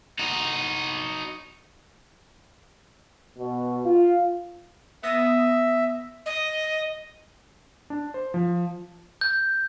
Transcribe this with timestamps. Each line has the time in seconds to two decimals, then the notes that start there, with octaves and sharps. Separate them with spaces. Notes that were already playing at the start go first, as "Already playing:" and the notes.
0.19 D#4 F#4
3.38 B2
3.86 F4
5.03 B3 E5 D#6 A#6
6.26 D#5
7.90 D4
8.14 C5
8.34 F3
9.21 G6